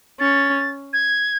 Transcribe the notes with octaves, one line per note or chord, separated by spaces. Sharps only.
C#4 A6
G#6